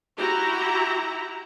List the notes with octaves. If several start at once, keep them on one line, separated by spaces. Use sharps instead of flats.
E4 F#4 G4 A#5